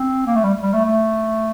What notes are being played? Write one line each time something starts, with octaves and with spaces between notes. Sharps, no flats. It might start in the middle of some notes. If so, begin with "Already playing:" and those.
Already playing: C4
A#3
A3
G3
G3
A3
A3